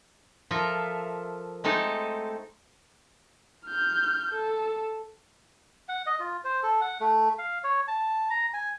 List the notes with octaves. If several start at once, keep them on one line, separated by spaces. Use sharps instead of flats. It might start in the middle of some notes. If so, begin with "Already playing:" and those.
F3 F4 A4 A#4 E5
G#3 A3 C4 D#4 A4
F6 G6
A4
F#5
D#5
F4
C5
A4
F#5
A3
F5
C#5
A5
A#5
G#5